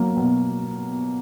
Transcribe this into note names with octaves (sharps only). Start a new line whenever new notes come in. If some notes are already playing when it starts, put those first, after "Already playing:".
Already playing: F#3 A#3
B2